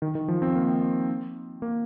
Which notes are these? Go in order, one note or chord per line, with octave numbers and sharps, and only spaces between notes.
D#3
D#3
F3
C4
A#3
A#3